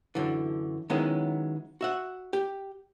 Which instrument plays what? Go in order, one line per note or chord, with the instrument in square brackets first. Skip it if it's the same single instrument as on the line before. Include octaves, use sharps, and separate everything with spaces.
[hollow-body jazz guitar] F#2 D3 E3
D#3 F#3 G#3 B3 C#4 E4
F#4 E5 F#5
G4